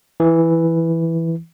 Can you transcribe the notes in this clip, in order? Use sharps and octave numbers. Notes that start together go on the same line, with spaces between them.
E3